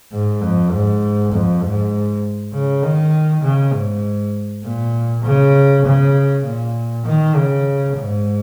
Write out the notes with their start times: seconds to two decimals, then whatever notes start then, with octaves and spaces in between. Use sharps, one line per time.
0.12 G#2
0.42 F2
0.71 G#2
1.32 F2
1.63 G#2
2.53 C#3
2.83 D#3
3.43 C#3
3.73 G#2
4.64 A#2
5.24 C#3
5.85 C#3
6.44 A#2
7.06 D#3
7.35 C#3
7.96 G#2